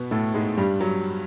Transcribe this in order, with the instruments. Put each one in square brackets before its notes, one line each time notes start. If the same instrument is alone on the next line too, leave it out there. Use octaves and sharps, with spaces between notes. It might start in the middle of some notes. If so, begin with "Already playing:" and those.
Already playing: [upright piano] B2 B3
A2 A3
G#2 G#3
G2 G3
F#3